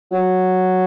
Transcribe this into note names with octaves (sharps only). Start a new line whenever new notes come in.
F#3